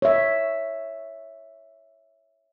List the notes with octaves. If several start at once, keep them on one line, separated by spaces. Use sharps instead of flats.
C#5 E5